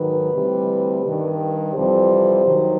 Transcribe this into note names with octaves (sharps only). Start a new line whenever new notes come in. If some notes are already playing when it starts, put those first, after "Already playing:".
Already playing: G#2 D#3 F#3 B4
D2 C3 E3 G3
G2 D#3 G3
F2 C3 E3 G3 C5
G2 D#3 F#3